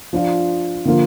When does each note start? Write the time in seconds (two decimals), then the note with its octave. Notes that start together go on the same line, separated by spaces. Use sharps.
0.13 F3 D4 F4
0.85 D3 F3 A#3 F4